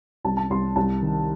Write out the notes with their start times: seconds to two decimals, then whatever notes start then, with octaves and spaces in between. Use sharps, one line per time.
0.24 C2 A5
0.37 A5
0.50 C2 C6
0.76 C2 A5
1.02 D#3